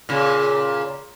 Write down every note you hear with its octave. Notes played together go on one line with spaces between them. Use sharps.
A#2 C#3